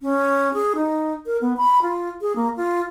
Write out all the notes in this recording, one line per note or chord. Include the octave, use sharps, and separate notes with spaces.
C#4
G#4
D#4
A#4
B3
B5
F4
G#4
A#3
F4